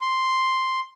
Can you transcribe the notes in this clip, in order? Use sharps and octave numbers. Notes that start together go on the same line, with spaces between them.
C6